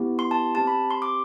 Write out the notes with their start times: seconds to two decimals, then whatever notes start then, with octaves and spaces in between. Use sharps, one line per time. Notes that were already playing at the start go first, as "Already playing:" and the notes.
Already playing: B3 E4 G4
0.19 C6
0.31 A5
0.55 C4 G4 A5
0.67 B5
0.91 C6
1.02 D6